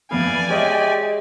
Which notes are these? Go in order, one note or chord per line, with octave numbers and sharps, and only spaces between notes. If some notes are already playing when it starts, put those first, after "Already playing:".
F2 E3 B3 D5 F5 G#5
G#3 G4 C#5 D#5 E5